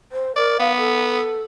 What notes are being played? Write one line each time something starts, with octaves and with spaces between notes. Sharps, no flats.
C5
A#4 D5
B3 F5
A4